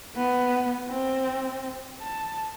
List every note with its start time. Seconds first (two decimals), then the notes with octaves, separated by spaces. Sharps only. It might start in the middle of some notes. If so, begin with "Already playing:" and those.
0.16 B3
0.88 C4
2.01 A5